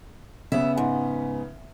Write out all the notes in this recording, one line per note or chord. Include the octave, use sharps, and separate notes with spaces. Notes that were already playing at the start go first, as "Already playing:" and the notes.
C#3 B3 E5
G#2